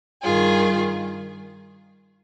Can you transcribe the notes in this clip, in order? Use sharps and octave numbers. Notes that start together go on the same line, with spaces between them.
G2 D#3 F4 G#4